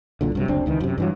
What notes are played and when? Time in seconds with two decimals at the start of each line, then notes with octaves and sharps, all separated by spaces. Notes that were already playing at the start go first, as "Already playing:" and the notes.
0.21 C2 A#2 D3
0.35 G2 C3 F#3
0.48 F#1 D2 C4 D4
0.66 C#2 D#3 E3
0.80 F#2 C3
0.98 G2 E3 F#3